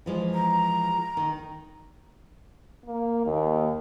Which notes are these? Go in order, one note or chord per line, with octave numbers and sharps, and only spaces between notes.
E3 F3 G#3
A#5
D#3
A#3
D#2